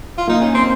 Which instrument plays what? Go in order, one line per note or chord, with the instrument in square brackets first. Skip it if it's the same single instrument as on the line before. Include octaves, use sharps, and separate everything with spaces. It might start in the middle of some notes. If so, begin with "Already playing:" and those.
[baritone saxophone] F4
[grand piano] A#3 [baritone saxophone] D#4
[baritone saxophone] C#4
C4